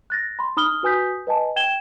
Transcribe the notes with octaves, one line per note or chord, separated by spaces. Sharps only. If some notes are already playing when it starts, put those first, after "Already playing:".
F#6 A6 A#6
B5 C6
D#4 B5 D#6 F6 G7
F#4 B4 G#5 D#6 G6 B6
B4 D#5 G#5 A5
G5 G#6 E7 G7